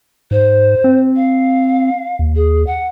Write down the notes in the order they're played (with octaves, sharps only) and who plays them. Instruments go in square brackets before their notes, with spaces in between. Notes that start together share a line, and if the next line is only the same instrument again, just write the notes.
[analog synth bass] G#2 [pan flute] C5
[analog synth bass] C4
[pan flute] F5
[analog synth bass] D#2
[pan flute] G#4
F#5